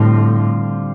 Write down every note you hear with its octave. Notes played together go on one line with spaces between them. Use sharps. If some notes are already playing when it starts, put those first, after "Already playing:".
Already playing: A2 D3 G3 C4 F4